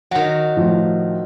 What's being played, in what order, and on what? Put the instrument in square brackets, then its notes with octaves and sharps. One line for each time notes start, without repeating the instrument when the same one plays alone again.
[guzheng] D#3 F#3 [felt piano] F#5
[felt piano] A2 F3